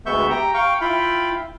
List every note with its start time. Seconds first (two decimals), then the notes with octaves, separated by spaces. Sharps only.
0.06 D2 G#3 B3 E5 C#6 G6
0.30 G4 G5 A#5
0.54 F5 G5 C#6
0.81 E4 F4 F5 G5 B5